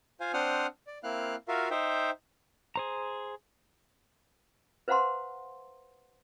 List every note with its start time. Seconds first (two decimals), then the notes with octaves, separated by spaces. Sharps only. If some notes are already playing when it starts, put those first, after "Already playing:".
0.20 F4 C5 F5 G#5
0.33 C4 D4 C5 F#5 D#6 F6
0.87 D5
1.03 A#3 C4 E4 F5 F6 F#6
1.48 F4 F#4 A#4 E5 F5
1.71 D#4 C5 E5 G5
2.76 G#4 C5 A#5
4.88 B4 C5 F5 F#5 A#5 C6